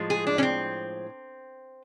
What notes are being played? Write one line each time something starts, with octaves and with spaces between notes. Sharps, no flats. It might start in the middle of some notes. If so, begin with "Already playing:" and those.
Already playing: A2 F3 G#3
G#4
D4
C#4
C4